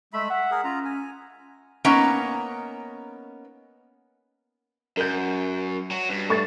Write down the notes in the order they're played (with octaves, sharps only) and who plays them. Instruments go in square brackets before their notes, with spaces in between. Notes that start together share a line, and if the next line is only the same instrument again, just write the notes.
[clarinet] G#3 [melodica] A3 E5 B5
[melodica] E5 [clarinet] F#5
[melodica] G#4 A#4
[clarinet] C#4 [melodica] F4 A#5
[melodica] G#5
[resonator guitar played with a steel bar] A#3 B3 C#4 D#4
[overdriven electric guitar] F#2 [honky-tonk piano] A#4 G6
[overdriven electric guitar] F#3
G2
[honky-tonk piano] A3 C#6 A6